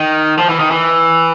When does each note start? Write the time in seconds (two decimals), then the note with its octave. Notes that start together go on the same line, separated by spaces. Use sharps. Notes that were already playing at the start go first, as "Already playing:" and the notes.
Already playing: D#3
0.38 F3
0.49 E3
0.60 D#3
0.71 E3